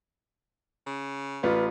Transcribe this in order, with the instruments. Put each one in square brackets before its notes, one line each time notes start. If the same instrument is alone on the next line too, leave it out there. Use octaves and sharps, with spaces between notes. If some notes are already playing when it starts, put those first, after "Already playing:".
[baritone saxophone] C#3
[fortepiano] A1 [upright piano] F4 [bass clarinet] B4